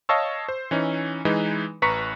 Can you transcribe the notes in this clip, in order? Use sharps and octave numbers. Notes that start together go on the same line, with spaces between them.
C#5 D#5 F5 A5 C#6 E6
C5
E3 C#4 D#4
E3 G#3 D#4 B4
A1 B4 A#5 C#6 B6 C#7